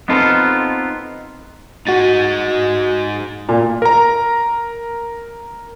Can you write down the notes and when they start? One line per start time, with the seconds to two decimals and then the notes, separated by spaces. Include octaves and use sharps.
0.08 B3 C4 D#4 F4 A4 B4
1.87 G#3 D#4 F#4 A6
3.49 A#2
3.82 A#4 A#5